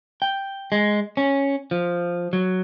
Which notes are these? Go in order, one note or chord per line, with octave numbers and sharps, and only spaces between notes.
G5
G#3
C#4
F3
F#3